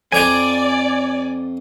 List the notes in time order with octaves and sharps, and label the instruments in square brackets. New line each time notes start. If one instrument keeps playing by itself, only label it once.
[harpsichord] F2 A#5 C6 [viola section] D5 [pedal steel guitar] G#5